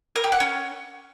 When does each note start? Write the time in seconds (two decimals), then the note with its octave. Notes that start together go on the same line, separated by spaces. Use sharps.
0.16 A#4
0.24 G4
0.32 F#5
0.40 C#4